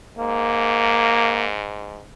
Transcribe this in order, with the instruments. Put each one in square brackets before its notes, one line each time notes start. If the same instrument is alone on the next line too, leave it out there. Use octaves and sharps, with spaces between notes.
[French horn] G#2 [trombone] A#3